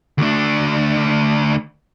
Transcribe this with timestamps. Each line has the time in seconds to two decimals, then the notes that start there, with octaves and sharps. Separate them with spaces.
0.18 D2 D4